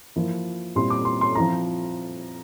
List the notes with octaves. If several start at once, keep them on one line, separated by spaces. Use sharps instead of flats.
F3 A#3 E4
A#2 G3 C4 E4 C6
D6
C6
C6
F3 C4 E4 A#5